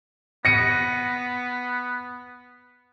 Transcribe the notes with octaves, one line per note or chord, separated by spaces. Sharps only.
B3 A#6 C#7 D#7